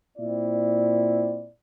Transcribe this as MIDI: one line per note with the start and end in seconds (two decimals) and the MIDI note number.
0.17 1.49 46
0.17 1.49 60
0.17 1.49 64
0.17 1.49 74